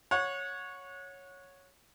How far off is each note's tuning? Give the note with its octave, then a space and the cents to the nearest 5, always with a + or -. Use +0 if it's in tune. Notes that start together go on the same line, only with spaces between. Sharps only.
C#5 +0 F#5 -25